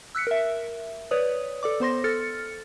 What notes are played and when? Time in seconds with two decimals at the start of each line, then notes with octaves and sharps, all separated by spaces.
0.15 E6 F#6 B6 C#7
0.27 A#4 E5
1.11 B4 C#5 D5 D#6
1.63 A4 D5 D6
1.80 B3 C5 C6 A#6
2.04 A4 F6 A6 C#7